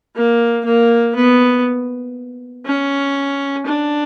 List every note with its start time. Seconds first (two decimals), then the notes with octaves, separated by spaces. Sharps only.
0.16 A#3
0.65 A#3
1.16 B3
2.66 C#4
3.66 D4